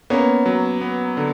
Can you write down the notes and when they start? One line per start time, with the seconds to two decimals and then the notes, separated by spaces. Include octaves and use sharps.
0.10 A#3 B3 C#4
0.46 F#3
0.81 B3
1.17 D3